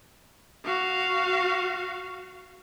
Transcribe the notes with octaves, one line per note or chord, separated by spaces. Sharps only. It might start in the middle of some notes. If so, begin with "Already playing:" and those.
F#4 F5